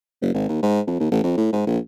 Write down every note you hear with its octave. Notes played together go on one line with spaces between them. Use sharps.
F#1
G#1
D#2
G#2
F2
D#2
A1
F2
A2
G#2
A#1